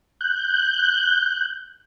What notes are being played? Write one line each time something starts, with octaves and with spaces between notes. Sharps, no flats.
F#6 G6